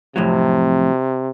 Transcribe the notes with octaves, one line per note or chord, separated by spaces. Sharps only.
F2 A2 C3 F#3